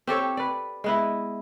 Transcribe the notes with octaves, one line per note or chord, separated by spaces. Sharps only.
C4 G4 A4 C#5
B4 D5
G#3 B3 E4